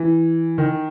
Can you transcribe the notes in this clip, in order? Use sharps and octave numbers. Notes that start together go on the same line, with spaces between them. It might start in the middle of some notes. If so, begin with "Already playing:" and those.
Already playing: E3
D#3